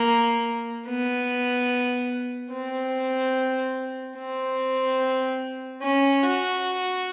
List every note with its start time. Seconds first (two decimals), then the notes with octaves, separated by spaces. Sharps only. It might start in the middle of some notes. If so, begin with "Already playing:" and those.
Already playing: A#3
0.88 B3
2.52 C4
4.17 C4
5.83 C#4
6.23 F#4